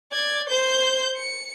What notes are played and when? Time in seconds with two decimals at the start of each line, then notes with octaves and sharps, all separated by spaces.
0.12 D5 G#6
0.49 C5 G6
1.17 C#7